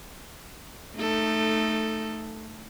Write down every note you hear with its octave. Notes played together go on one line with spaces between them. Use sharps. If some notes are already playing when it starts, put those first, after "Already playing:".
A3 D#4 A4